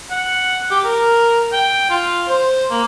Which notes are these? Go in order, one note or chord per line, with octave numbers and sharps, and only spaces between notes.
F#5
G4
A#4
G5
F4
C5
A#3